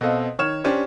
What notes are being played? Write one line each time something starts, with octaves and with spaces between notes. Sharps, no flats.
B2 C4 A4 D#5 F5
D#3 C#5 F6 E7
C#4 D4 G4 C5